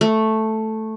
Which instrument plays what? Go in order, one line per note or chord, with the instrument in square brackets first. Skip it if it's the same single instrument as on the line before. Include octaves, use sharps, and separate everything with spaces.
[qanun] A3